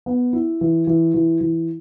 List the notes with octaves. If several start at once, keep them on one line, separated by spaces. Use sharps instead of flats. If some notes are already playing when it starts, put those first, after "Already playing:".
B3
E4
E3
E3
E3
E3